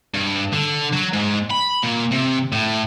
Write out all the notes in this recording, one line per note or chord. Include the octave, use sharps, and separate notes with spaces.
G2
D3
F#3
G#2
B5
A#2
C3
A2